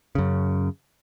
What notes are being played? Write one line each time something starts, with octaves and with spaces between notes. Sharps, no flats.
F#2 C#3